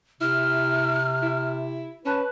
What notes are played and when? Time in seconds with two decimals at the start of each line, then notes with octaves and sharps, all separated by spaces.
0.21 C3 E4 F6
1.23 E4
2.06 C#4 B4 A5